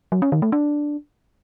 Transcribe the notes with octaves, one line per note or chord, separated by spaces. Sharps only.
F#3
C#4
D#3
A3
D4